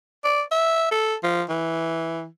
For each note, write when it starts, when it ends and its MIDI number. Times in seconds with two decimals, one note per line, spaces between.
0.24 0.42 74
0.52 0.91 76
0.91 1.15 69
1.23 1.44 53
1.49 2.27 52